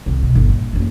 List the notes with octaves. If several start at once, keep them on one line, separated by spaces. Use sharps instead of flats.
C2 D3
B2
G1
A#2
F#1 F2